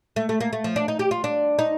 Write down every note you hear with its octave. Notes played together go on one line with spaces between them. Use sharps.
A3
A3
A#3
A3
F3
D4
D#4
G4
F4
D4
D#4